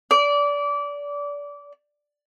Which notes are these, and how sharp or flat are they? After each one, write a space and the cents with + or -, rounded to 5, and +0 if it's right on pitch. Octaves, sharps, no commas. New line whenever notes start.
D5 -25